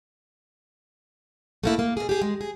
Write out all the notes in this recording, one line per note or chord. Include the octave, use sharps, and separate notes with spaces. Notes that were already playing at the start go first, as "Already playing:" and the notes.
A3 A#3 E4
A#3
B2 G#4
G4 G#4
G#3
G#4